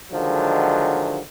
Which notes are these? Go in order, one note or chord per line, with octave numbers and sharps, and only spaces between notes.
D3 D#3 F3 F#3 G#3